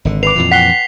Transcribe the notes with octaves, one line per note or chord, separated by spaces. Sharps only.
G#1 D3
B4 D6 C7 F7
F2 A#2 E3
F#5 G5 B6 C7 G7